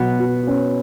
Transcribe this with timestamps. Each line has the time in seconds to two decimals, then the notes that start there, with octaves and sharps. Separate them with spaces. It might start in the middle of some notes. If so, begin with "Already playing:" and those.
Already playing: B2 F#3 B3
0.19 F#4
0.47 C#4